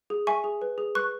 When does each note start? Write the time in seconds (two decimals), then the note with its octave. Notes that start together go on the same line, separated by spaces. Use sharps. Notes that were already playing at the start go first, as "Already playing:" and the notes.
0.10 G#4
0.27 E5 G#5 C#6
0.44 G#4
0.62 B4
0.78 G#4
0.95 B4 C#6 F#6